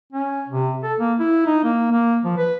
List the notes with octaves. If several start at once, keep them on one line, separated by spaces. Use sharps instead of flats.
C#4
C3
A4
A#3
E4
D#4
A#3
A#3
F3
B4